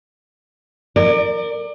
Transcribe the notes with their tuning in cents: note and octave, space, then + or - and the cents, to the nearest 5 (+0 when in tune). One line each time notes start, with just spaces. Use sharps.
A#4 -10 D5 +30